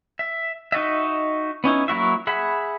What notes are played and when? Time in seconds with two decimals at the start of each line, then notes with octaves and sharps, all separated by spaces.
0.19 E5
0.72 D#4 F#4 D#5 E5
1.64 B3 C#4 D#4 E4
1.88 F#3 A#3 E4 F#4 E5
2.27 G#4 E5 F#5 B5